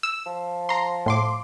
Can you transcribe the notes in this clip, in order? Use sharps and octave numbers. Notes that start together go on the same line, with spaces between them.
E6
F3
A#5 C6
A2 C6 D6